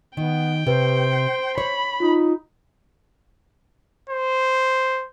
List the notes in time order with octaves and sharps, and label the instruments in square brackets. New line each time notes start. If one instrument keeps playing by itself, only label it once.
[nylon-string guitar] D#3 [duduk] B3 [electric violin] G5
[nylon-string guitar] C3 [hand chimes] G4 B4 [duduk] C5
[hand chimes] C7
[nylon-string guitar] C#5 [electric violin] B5
[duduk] D#4 [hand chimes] F4
[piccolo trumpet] C5